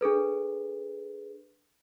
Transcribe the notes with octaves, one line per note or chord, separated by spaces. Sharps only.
D4 G#4 A4 B4